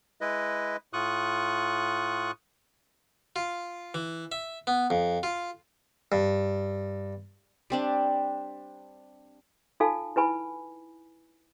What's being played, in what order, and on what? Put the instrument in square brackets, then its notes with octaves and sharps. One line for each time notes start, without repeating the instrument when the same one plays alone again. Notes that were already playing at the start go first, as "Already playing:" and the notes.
[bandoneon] G#3 E4 B4 D#5
A2 F4 C#6 D#6 F#6
[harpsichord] F4
E3
E5
B3
F2
F4
G2
[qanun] G3 C4 D4
[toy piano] D#4 F4 A4 F5 G#5 A5
E4 B4 G#5 B5